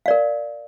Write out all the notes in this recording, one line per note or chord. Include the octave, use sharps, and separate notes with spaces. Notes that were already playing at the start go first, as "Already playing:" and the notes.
A#4 D5 F5